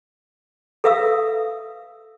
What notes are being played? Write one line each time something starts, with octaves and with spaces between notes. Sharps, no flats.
A4 B4 E5 F5 D#6 E6